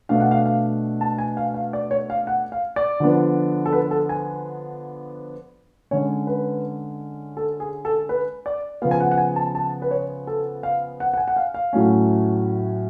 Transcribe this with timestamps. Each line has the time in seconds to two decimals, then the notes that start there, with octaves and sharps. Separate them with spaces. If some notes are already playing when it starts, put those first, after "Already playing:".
0.09 B2 A3 D4 F5
0.20 F#5
0.31 F5
0.45 F5
1.01 A5
1.18 G#5
1.37 F5
1.54 F5
1.73 D5
1.91 C#5
2.10 F5
2.27 F#5
2.52 F5
2.76 D5
3.00 D3 F3 B3 D4
3.66 A4
3.73 B4
3.91 A4
4.09 G#5
5.91 D3 G#3 C#4 C#5
6.27 B4
7.37 A4
7.60 G#4
7.85 A4
8.09 B4
8.46 D5
8.82 C#3 F3 B3 F5
8.91 G#5
9.00 F#5
9.11 F#5
9.18 G#5
9.36 A5
9.55 A5
9.82 B4
9.91 C#5
10.27 A4
10.63 F5
11.00 F#5
11.14 F#5
11.17 G#5
11.28 F#5
11.36 F5
11.54 F5
11.73 A2 F#3 A3 C#4